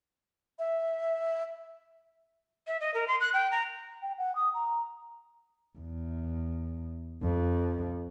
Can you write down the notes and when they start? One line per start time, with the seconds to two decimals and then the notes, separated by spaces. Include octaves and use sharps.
0.59 E5
2.67 E5
2.81 D#5
2.94 A#4
3.08 C6
3.21 F#6
3.34 G5
3.51 A#5
4.02 G5
4.18 F#5
4.36 D#6
4.54 A#5
5.78 E2
7.22 F2